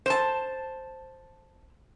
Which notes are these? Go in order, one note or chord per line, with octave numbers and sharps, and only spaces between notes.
C5 A5